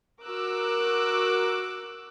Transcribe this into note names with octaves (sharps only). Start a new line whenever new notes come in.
F#4 A#4 D6 E6 F#6